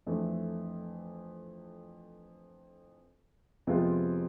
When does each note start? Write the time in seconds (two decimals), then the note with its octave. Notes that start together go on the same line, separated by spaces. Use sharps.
0.07 F2 E3 A3 D4
3.67 F2 C3 G#3 B3 F4